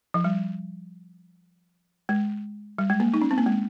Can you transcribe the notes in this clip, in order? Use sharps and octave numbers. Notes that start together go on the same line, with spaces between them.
F3
G3
G#3
G3
G#3
A#3
D#4
C#4
C4
A#3
G#3